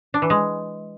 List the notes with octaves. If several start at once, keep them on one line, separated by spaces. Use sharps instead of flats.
D4
E3
G#3